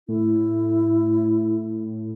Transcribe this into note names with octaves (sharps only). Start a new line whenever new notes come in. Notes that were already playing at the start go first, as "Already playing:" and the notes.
A2 E4